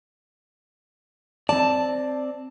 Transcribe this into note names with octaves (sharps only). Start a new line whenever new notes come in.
C4 D5 A5